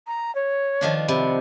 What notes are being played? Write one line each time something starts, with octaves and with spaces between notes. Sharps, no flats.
A#5
C#5
D#3 F3 D4
C3 B5